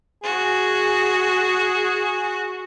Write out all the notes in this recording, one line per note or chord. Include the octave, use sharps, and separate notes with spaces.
F#4 G#4